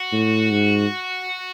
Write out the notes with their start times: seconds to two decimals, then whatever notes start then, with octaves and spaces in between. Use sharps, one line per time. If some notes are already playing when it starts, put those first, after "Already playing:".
Already playing: F#4
0.13 A2
0.51 G#2